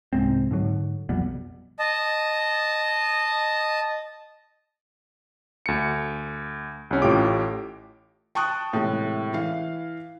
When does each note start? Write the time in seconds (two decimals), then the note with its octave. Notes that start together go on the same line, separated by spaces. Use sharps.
0.13 C2 G#2 G#3 C4
0.51 G#2 D3 F#3
1.09 B1 F2 G3 B3
1.79 D#5 A5
5.66 D2 C#7
6.91 C2 C#4
7.02 A1 A2 F4 G4 D6
8.35 G5 A5 C#6 D#6 F#6
8.73 A2 C3 E3 G#3
9.34 E3 F5